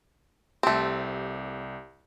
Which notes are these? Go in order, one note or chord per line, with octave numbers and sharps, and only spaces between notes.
C2 A3 C4 G4